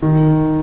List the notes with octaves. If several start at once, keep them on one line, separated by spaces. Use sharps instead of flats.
D#3